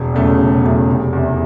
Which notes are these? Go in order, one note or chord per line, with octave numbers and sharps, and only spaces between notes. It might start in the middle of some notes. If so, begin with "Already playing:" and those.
Already playing: E1
E2 C#3 F#3 A3
E1
E2 C#3 F#3 A3
F1
E2 C3 E3